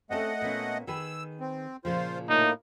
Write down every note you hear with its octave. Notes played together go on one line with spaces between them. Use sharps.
A3 C4 C#4 A4 D#5 F#5
A#2 B3 C#4
D#3 G#4 B4 E6
C4
A#2 C#3 F3 F4 C5
A2 A#3 D#4